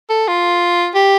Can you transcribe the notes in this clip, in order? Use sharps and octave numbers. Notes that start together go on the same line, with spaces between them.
A4
F4
G4